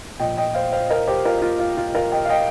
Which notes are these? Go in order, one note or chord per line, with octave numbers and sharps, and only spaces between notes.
A#2 F3 D#5 G5
D#5 G5
C5 F5
C5 F5
A#4 D#5
G4 C5
F4 A#4
F4
F4
F4
F4 A#4
D#5 G5
F5
D#5 G5